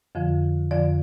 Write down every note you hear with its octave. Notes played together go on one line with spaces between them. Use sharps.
F2 D3 F3
F2 D3 F3 D5